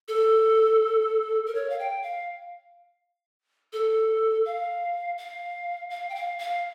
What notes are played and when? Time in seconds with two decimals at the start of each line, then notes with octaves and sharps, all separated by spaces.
0.08 A4
1.47 A#4
1.55 C#5
1.70 F5
1.79 G5
2.03 F5
3.73 A4
4.45 F5
5.18 F5
5.90 F5
6.09 G5
6.15 F5
6.39 F5